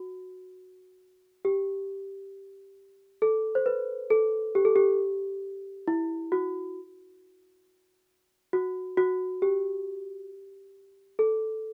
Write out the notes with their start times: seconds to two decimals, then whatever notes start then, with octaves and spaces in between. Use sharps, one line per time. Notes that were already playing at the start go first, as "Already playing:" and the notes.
Already playing: F#4
1.45 G4
3.22 A4
3.55 C5
3.66 B4
4.10 A4
4.55 G4
4.65 A4
4.76 G4
5.88 E4
6.32 F#4
8.53 F#4
8.97 F#4
9.42 G4
11.19 A4